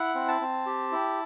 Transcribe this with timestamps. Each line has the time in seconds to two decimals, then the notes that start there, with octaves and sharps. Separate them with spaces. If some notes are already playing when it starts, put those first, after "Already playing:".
Already playing: E4 F#5
0.15 C4
0.28 A5
0.41 C4
0.66 G4
0.92 E4